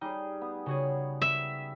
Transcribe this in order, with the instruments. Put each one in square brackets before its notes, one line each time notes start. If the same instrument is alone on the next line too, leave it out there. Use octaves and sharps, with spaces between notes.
[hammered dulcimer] G3 G#4 [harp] D#4
[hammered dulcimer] B3
[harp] C#3 F#4 G#4 [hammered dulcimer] C#5
[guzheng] E5